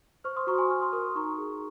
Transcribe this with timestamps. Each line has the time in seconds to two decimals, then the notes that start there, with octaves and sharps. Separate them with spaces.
0.24 C5 C#6 F6
0.36 C6 D#6
0.47 F#4 A#5 C#6
0.58 G#5 C6
0.70 F#4 C#6 F6
0.82 C6 D#6
0.93 A#4 C6 D#6
1.15 D#4 A#5 C#6
1.38 G#4